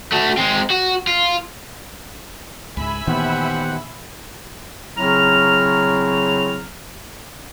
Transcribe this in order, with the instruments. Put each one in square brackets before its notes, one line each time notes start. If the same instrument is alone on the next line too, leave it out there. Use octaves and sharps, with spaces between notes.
[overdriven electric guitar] A3 F#4
G#3 C4
F#4
F4
[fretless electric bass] C#2 G#2 [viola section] E5 G#5 B5
[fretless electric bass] A#2 E3 A#3 [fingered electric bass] D#3 B3 [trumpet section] G4 C5 F#5
[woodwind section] C#3 F#3 C4 E4 A#5 F6